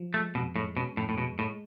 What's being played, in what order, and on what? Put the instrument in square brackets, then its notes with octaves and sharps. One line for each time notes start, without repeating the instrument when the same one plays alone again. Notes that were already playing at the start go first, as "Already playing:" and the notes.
Already playing: [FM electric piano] F3
[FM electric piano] G#3 [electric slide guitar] A3
[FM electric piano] F2 [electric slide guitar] B2
[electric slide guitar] A2 [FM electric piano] G#3
[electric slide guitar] B2 [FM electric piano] C#4
[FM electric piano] F2 [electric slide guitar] A2
[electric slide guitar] A2
[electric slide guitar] B2 [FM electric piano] G#3
[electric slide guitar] A2 [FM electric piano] G#3